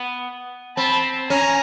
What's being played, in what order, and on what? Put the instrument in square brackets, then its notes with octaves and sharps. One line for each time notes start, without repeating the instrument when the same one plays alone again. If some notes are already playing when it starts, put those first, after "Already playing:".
Already playing: [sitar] B3
[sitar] C4 [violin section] A5 B5
[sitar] C#4 [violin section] G#5 A#5